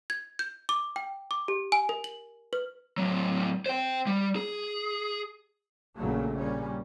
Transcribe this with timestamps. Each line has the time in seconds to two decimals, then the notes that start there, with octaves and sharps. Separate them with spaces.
0.10 G#6
0.39 G6
0.69 D6
0.96 G5
1.31 D6
1.48 G4
1.72 G#5
1.89 A#4
2.04 F#7
2.53 B4
2.98 A2 F#3
3.66 C5 G5
4.07 G3
4.36 G#4
5.96 A#1 A#2 C#3 F#3 A3
6.36 A#2 G3 C#4